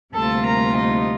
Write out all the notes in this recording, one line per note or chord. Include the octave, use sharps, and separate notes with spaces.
D2 C3 G3 A#3 F4 A4 A5
A#4 A#5
D#4 D#5